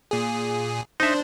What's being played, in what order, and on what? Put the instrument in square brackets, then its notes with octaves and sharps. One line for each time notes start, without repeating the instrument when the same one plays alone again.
[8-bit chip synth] A#2 G#4
[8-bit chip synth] D4 C5 [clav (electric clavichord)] D#4 E5